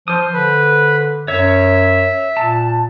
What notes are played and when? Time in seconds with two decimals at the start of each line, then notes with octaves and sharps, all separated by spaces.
0.08 F3 C5 D#6
0.33 D3 B4
1.28 F#2 C#5 E5
2.37 A#2 A5